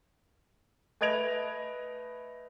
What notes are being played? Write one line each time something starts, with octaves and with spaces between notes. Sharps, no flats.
A3 B4 D#5 G#6 D7 F7